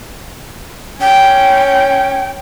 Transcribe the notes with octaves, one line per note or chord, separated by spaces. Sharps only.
C#4 G5